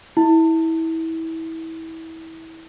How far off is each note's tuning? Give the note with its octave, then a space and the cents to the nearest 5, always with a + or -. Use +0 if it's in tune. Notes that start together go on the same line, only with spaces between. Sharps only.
E4 -25